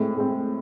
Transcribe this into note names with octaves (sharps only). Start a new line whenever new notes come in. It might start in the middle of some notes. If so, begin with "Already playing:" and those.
Already playing: A2 G#3 C4
A2 G#3 C4